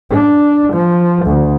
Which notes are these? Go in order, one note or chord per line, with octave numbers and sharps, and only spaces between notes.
D4
F3
D2